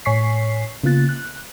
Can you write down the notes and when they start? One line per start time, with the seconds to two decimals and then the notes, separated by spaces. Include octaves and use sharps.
0.05 A2 C#5 G#5 C#6 B6 C7
0.83 C#3 A#3 B3 F4 F#6 A6
1.09 F#6